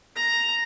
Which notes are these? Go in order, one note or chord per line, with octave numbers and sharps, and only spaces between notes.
A#5